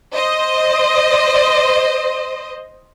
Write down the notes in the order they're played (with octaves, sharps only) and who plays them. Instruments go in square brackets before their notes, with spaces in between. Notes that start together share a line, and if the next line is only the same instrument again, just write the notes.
[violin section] C5 D#5